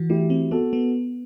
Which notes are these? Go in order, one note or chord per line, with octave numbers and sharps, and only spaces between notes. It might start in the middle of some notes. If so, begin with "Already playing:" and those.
Already playing: E3 F#4
A3 E4 G4
C4
B3 F#4 A4
B3